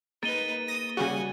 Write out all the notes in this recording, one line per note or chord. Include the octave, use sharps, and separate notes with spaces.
A#3 D#4 G#4 A#4 B4 A6 D#7 G7
D#6 A#6
C#3 G3 F#4 F#5 G#5